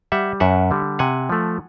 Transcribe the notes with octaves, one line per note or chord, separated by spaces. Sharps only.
G3 E5 F#5
F#2 E5 F#5
D3 G3
C3 F#5 G#5
F3 A3